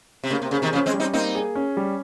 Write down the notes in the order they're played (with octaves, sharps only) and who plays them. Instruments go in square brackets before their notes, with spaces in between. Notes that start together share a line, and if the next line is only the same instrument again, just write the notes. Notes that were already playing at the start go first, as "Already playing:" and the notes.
[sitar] C3
[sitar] C#3 [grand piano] A#3
[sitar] C3
[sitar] C#3 [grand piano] G#4
[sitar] C3 D#3
[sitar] C#3 F3 [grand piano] C#4
[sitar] G#3 C4
[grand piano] G3
[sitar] C4 D#4
[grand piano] A#3 [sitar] C4 D#4
[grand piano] G#4
C#4
G3